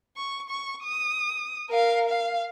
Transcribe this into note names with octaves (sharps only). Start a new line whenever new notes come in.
C#6
C#6
D#6
A#4 F5
F5